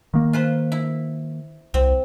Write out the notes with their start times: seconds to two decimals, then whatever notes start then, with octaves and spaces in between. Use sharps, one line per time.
0.14 D#3 A#3
0.33 F4 B4 C5
0.72 E4
1.74 C2 C4